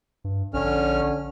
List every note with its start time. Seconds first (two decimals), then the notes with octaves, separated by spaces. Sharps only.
0.24 G2
0.54 A#1 D3 C#4 F6